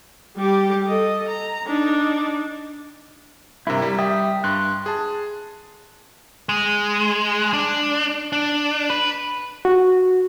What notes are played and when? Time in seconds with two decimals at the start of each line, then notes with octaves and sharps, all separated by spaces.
0.36 G3 G4
0.86 A4 D#5
1.29 A#5
1.67 D4 D#4
3.67 G2 C3 E4 A#4
3.82 G3
3.99 G3 E5 G5 D#6
4.44 G2 C6 F#6
4.86 G#4 A5
6.49 G#3
7.53 D4
8.33 D4
8.90 B4
9.65 F#4